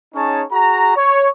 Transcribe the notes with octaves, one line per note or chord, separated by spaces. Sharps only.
C#4 D#4 G#4 C#5 A5
F#4 G#4 A#5
C#5